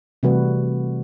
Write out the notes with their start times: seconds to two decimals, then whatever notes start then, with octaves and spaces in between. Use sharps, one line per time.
0.23 C3 E3 G3 A3 F#4 B4